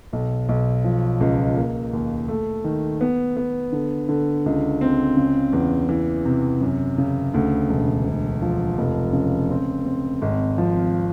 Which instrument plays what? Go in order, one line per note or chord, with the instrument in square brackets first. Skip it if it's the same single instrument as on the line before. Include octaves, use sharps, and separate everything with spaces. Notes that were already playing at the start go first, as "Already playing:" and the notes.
[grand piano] B1
B1
F3
C#2
A#3
D#2
A3
D#3
B3
B3
D3
D3
C#2
C4
C#3
E2
E3
C3
F#2
C#3
D2
E1
E1
F3
F1
C#3
C4
C4
G#1
F3